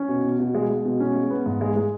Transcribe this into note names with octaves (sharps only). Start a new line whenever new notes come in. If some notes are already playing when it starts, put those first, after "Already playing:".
Already playing: C#4
B2
B2
B2
G#3
G#3
B2
C#4
G#3
B3
G#2
G#3
G#3